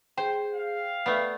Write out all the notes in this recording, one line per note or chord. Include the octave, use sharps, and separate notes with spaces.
G#4 C5 G5
F5
A3 B3 B4 D5